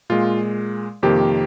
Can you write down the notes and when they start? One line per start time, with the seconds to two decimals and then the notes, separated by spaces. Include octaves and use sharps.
0.10 A#2 G#3 F4
1.03 F2 C3 D#3 A#3 G4